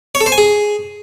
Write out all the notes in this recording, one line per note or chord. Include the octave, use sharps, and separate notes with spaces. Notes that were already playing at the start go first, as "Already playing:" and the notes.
C#5
A4
C5
G#5
G#4